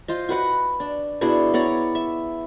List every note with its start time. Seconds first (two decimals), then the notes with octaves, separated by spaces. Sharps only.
0.08 F4 C5 D#5
0.29 F#4 B4 F#5
0.80 D4
1.21 B2 D4 E4 G#4
1.54 B3 C#5 D5 A#5
1.95 E5